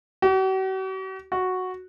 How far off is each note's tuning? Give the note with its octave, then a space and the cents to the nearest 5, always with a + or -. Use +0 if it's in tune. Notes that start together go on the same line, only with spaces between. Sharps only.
F#4 +45
F#4 -5